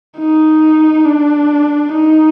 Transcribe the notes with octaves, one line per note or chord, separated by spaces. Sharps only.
D#4
D4
D#4